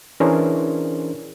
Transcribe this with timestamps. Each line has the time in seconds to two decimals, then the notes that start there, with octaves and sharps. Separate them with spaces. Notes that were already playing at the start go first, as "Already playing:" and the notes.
0.20 E3 C#4 D4 G#4 A#4 C5